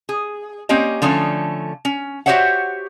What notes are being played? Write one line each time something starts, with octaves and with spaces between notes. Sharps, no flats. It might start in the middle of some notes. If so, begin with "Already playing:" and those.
G#4
A#3 C4 C#4 G4 D#5
D3 F3 A3 C#4 C#5
C#4
F#4 G4 C5 C#5 E5 F#5